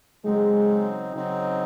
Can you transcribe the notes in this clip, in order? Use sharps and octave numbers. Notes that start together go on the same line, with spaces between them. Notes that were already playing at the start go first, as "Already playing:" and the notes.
C#3 F#3 G#3 C4 D#4
C#3 F#3 C4 D#4